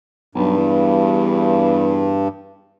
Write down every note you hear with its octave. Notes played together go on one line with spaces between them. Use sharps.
B1 G2
E2